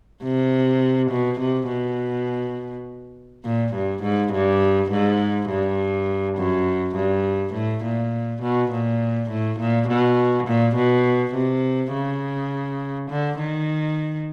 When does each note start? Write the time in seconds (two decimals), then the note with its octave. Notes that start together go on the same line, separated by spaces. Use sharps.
0.23 C3
1.11 B2
1.40 C3
1.69 B2
3.44 A#2
3.74 G2
4.03 G#2
4.32 G2
4.91 G#2
5.49 G2
6.37 F#2
6.95 G2
7.53 A2
7.84 A#2
8.42 B2
8.71 A#2
9.30 A2
9.59 A#2
9.88 B2
10.47 A#2
10.76 B2
11.34 C3
11.93 C#3
13.10 D3
13.39 D#3